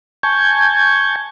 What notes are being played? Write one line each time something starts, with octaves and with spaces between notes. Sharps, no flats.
G#5 A5 C#6 G6 G#6